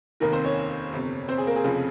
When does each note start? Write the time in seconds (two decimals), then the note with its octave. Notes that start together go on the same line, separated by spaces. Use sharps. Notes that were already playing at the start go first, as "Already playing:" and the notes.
0.20 F1 D#2 D#3 A#3 A#4
0.32 C4 C5
0.44 C#4 C#5
0.92 G1 F2 C3
1.28 C4 C5
1.38 G#4
1.46 A#3 A#4
1.56 G#4
1.64 F1 F2 C#3 F3